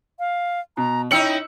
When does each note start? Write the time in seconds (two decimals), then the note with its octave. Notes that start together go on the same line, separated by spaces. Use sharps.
0.19 F5
0.77 B2 A#5
1.11 C#4 D#4 E4 G5 E6 C#7 F#7